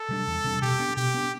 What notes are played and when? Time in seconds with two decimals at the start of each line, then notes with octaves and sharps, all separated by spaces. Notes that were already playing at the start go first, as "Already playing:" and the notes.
Already playing: A4
0.09 C3 G3 D4
0.27 E2
0.44 C3 G3 D4
0.62 B2 G4
0.79 B3 D4
0.96 B2 G4
1.14 B3 D4